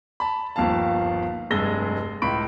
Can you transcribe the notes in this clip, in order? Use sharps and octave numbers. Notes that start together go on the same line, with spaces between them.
A5 B5
G1 D#2 F3 F5 A5
F1 G2 G#3 E6 A#6 G7
C#2 A2 B5 C#6 D7